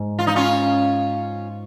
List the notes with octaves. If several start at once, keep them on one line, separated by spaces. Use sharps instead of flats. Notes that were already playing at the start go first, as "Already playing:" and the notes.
Already playing: G#2
F4
D#4
C#4 F4